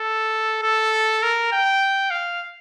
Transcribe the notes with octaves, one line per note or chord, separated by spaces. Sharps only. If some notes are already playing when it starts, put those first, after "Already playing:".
Already playing: A4
A4
A#4
G5
F5